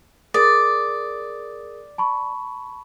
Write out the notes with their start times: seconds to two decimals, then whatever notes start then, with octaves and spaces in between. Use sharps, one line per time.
0.34 G#4 A#4 D5 D#6
1.98 A5 B5 C#6